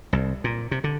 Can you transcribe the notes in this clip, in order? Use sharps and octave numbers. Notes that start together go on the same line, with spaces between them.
C2
A#2
C3
D3